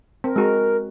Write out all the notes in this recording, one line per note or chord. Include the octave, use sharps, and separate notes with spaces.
C4 A#4
G#3 F#4